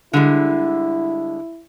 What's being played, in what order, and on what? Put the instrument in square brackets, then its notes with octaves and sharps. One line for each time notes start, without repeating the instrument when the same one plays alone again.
[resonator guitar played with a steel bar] D3 G3 G#3 [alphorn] E4